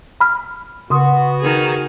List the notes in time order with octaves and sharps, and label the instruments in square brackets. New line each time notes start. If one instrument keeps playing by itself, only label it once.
[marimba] B5 F6
[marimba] C#3 C6 D#6 [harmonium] B3 F#4
[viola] D#3 G#4